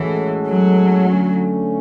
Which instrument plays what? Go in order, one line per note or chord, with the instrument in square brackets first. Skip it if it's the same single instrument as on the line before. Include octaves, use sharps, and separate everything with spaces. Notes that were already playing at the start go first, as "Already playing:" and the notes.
Already playing: [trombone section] A2 G#3 C#4 F#4 A4 [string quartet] E3
[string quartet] F#3
[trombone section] D3 A3 C#4